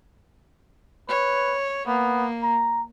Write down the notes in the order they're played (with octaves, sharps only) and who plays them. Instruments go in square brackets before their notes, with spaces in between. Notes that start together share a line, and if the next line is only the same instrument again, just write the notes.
[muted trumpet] B4 [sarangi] C#5
[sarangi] A#3 [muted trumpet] B3
[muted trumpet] A#5